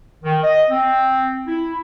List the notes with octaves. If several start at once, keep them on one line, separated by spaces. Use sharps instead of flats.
D#3
D#5
C4
E4